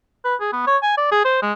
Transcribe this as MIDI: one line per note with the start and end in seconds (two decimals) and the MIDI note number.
0.25 0.35 71
0.40 0.49 68
0.53 0.66 59
0.67 0.77 73
0.83 0.92 80
0.97 1.10 74
1.12 1.22 68
1.25 1.39 72
1.42 1.53 56